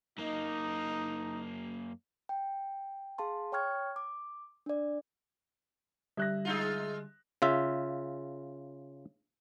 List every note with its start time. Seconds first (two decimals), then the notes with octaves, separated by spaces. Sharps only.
0.18 F#2 A#3 D#4
2.29 G5
3.18 G#4 F5 A5 C6
3.52 C#5 G5 C#6 F6 G#6
3.96 D6
4.66 D4 D5
6.17 D3 G3 E5 F#6 A#6
6.45 G#3 D#4 F4
7.42 C#3 F4 E5